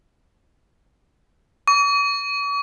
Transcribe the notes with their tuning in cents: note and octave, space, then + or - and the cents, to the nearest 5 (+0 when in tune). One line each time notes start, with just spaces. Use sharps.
C#6 +45